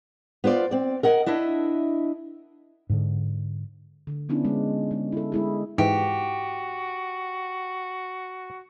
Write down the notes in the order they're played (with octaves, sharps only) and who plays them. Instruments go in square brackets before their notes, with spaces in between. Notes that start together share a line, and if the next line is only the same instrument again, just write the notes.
[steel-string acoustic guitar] B3 F4 C5 D5
C4 D5
A#4 D#5 F#5
D4 E4 D#5 E5
[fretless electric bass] G#2 D3
[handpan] D3
B3 C#4 D4 E4 F4
G#3
G#3
E4 A4
G#3 E4 G#4
[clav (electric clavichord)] G#2 E3 [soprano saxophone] F#4 [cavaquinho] G4